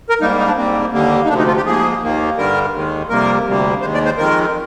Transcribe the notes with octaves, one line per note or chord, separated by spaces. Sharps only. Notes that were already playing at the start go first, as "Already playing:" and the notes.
A#4
G#2 G3 A#3 D#4
D#4
D4
G#2 G3 A#3 C4
D#2 D3 G3 A#3
D#4
D2 C3 F3 D4
D#4
F4
G4
G#2 F3 A#3 G#4
D#2 D#3 A#3
G2 D3 G3 A#4
D#2 D#3 G#3
F2 C3 G3 A#3 A#4
D2 C3 G3 A#3
D#2 D#3 G#3 C5
D5
C5
F2 D#3 G#3 A#4